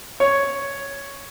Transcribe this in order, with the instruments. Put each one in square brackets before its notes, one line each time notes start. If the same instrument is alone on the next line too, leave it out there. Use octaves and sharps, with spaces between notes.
[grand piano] C#5